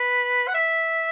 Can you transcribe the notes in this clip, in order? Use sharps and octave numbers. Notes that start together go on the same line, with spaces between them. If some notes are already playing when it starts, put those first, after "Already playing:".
Already playing: B4
F#5
E5